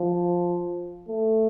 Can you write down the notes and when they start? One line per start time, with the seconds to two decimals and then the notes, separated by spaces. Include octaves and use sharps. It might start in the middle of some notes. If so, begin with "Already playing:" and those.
Already playing: F3
1.09 A3